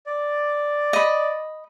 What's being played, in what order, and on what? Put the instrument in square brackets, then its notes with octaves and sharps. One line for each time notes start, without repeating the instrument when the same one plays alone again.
[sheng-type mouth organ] D5
[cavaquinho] D#5 B5